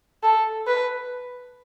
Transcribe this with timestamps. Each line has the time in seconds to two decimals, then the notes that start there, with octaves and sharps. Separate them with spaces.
0.23 A4
0.67 B4